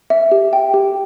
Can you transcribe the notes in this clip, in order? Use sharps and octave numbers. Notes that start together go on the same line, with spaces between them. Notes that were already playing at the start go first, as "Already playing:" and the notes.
E5
G4
G5
G4